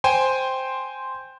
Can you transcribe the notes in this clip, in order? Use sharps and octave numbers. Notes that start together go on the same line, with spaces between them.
C5 G5 G#5 C6